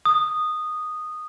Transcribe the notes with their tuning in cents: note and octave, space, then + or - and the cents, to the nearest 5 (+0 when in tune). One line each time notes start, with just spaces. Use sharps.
D#6 -10